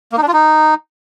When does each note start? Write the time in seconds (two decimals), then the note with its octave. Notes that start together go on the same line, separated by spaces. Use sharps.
0.12 A#3
0.17 D#4
0.23 D4
0.28 F4
0.33 D#4